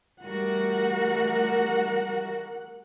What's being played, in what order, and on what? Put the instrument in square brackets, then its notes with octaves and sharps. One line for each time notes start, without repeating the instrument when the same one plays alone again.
[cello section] G3 A3 F#4 [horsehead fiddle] A#4 F#5